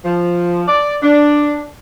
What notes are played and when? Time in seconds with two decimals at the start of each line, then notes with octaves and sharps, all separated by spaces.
0.05 F3
0.67 D5
1.03 D4